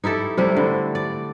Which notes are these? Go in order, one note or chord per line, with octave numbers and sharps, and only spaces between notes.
D#4 E4 G4 A4
C3 G3 A3 E4
D3
D5